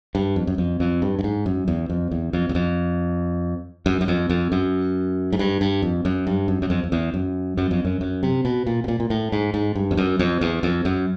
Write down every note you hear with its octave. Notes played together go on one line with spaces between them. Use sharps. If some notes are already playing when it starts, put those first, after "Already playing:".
G2
F2
F#2
F2
F2
G2
G2
G#2
F#2
E2
F2
E2
F2
E2
F2
F#2
F#2
F2
F2
F#2
G#2
G2
G2
F2
F#2
G2
F#2
F#2
F2
F2
E2
F#2
F#2
F2
F#2
F#2
C3
B2
A#2
B2
A#2
A#2
A2
G#2
G#2
G2
F2
F#2
F2
E2
F2
F#2